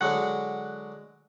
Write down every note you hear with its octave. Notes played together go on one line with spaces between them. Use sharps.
D3 F#3 G#3 F#5